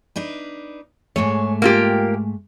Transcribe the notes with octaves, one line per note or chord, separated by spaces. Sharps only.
D4 D#4 B4
G#2 G#3 A3 C#5
A#3 F4 G4